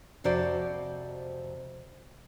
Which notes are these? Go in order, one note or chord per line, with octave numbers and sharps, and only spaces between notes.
F2 C3 F#4 C5 D5